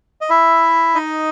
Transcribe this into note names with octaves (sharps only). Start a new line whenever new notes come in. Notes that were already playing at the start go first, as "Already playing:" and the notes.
D#5
E4 E5
D#4 D#5